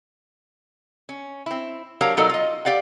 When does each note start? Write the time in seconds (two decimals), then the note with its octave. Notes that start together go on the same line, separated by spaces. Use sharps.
1.09 C#4
1.46 C4 E4
2.01 F#3 D4 G4 A#4 C#5 F5
2.17 B2 F#3 D#4 A4 A#4 D5
2.29 F4 D#5
2.65 G4 D5 F5 F#5